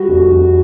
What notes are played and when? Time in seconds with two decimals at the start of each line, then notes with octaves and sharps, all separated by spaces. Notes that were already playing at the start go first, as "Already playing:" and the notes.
Already playing: G3 F#4
0.09 F1
0.31 F1